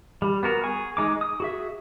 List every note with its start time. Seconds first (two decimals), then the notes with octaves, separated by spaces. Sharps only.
0.22 G3
0.43 B3 F#4 A#4
0.63 G#4 G#5 C#6
0.97 G#3 D#4 D6
1.21 D#6
1.40 F#4 G#4 E5